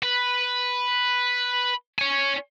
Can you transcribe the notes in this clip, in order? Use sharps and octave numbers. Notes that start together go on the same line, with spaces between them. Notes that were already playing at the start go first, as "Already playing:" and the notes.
B4
C#5 G#5